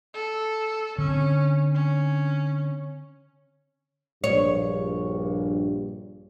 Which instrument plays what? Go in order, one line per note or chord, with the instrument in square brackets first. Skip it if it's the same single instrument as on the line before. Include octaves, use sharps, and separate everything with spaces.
[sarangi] A4
[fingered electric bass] D3 C4 [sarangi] C#4
[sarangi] C#4
[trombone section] A#1 G2 [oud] C#5